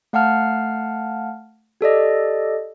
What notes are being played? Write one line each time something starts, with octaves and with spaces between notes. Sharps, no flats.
A3 F5 F#5 A5 F6
G4 A4 D5 D#5